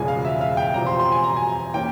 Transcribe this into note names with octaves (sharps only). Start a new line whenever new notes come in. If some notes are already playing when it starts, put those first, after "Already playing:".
Already playing: E1 E2 C#3 F3 G#3 G#5
F5
E5
F5
G5
E1 E2 C3 F3 A#5
C6
C6
G#5
A#5
G#5
E3 A#3 C#4 G5